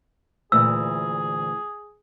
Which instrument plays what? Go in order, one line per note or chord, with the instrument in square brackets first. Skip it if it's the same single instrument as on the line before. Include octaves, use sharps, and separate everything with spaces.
[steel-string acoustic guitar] D2 A#2 E3 [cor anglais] G#4 [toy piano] E6